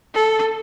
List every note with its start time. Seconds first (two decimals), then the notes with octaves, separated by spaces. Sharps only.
0.14 A4